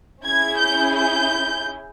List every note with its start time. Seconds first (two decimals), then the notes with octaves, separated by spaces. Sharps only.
0.23 C#4 E4 G#4 G#6
0.59 G6
0.95 G6